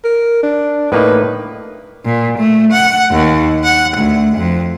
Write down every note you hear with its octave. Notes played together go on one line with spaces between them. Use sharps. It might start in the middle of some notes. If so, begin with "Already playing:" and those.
A#4
D4
A2 A#3 D#4 B4
A#2
A3
F#5
D#2
F#5
D2
F2